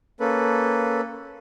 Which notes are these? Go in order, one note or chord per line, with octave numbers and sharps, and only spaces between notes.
A#3 C#4 A4 B4